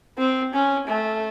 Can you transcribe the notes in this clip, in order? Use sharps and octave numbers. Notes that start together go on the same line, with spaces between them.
C4
C#4
A3